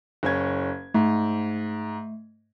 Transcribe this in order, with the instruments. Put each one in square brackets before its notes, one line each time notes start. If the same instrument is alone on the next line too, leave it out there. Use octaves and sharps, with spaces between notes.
[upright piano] F#1 C#4 G#6
[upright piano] G#2 [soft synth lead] A3